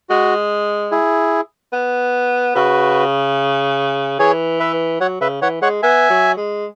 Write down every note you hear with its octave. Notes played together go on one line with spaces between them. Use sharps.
G#3 F#4
E4 G#4
B3
C#3 F#4 B4
E3 G#4 C#5
B4 E5
F#3 C#5 F#5
C#3 B4 E5
E3 C#5 F#5
G#3 C#5 F#5
B3 E5 G#5
F#3
G#3